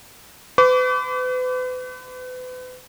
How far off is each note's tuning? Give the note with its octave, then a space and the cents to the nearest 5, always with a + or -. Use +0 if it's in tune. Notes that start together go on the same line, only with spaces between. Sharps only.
B4 +40 D6 -35